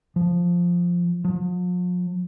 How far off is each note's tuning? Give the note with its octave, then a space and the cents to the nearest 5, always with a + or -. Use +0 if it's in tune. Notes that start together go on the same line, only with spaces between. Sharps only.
F3 +5
F3 +45